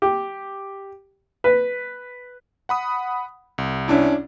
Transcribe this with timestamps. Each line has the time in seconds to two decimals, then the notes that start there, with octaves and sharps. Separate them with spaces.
0.02 G4
1.44 B4
2.69 F#5 B5 D#6
3.58 C2
3.88 C#4 D4 E4